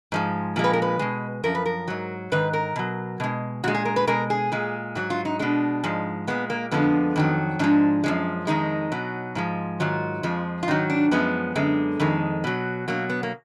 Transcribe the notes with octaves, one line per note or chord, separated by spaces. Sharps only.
G#2 F3 G#3
A#2 F3 G#3
B4
A#4
B4
B2 G#3
F#2 F3 A#4
B4
A#4
G#2 F#3
G#2 D#3 B4
A#4
B2 F#3
B2 G#3
A#2 G#3 F#4
G#4
A#4
B4
B2 G#3 A#4
G#4
A#2 G#3
G#2 F#3 F#4
F4
D#4
B2 G#3 D4
G#2 F3 G#3
A#2 G#3 B3
A#3
F2 D3 F3 G#3 B3
F2 D#3 F#3
G#2 F3 G#3 D4
F#2 F3 G#3
F2 D#3 G#3 D#4
B2 F#3
G#2 F3 G#3
G#2 D#3 F#3 F4
F2 F3 G#3
F4
G#2 D#3 F#3 D#4
D4
F#2 F3 G#3 B3
F#2 D3 G#3
F2 D#3 G#3
B2 F#3
B2 F#3 A#3
B3
A#3